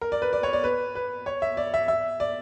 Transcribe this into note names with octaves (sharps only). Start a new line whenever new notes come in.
A#4
D5
B4
D5
C#5
D5
B4
B4
C#5
E5
D5
E5
E5
D5